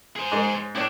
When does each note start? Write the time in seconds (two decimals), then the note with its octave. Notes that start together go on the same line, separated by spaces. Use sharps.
0.16 G#4 C5
0.32 G#2 G#3
0.75 A2 D4 E4 D5